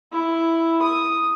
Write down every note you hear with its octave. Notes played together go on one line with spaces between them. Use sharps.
E4
D#6